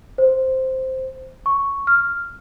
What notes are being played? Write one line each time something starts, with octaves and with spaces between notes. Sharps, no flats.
C5
C#6
F6